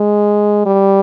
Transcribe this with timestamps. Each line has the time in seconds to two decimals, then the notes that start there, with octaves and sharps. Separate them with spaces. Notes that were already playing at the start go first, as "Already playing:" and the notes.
Already playing: G#3
0.66 G3